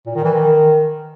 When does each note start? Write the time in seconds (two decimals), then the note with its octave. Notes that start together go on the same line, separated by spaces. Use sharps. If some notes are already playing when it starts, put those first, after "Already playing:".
0.06 A#2
0.15 D#3
0.24 E3
0.34 D#3